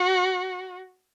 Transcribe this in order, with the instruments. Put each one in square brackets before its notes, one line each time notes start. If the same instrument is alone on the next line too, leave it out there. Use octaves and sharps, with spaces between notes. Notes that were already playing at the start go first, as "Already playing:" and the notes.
Already playing: [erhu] F#4